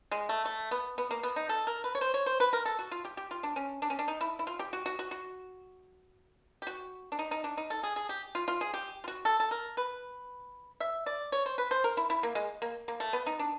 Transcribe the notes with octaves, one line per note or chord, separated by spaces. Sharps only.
G#3
A3
A3
B3
B3
A#3
B3
D#4
A4
A#4
B4
C#5
C5
C#5
C5
B4
A#4
A4
F#4
F4
G4
G4
F4
D4
C#4
D4
C#4
D4
D#4
E4
E4
F4
G4
F#4
F#4
F#4
F#4
G4
F#4
D4
D#4
D#4
D4
D#4
A4
G#4
G#4
G4
F4
F4
G#4
G4
F4
F#4
A4
A4
A#4
B4
E5
D5
C#5
C5
B4
C5
A#4
E4
E4
A#3
G#3
A#3
A#3
A3
B3
D#4
D4